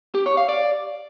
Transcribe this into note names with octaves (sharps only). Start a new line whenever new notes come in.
G4
C#5
F5
D5